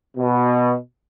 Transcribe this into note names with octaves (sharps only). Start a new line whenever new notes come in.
B2